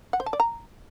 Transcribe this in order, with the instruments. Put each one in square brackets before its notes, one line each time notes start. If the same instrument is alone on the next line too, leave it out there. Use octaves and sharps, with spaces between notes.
[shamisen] F#5
C5
A5
D5
A#5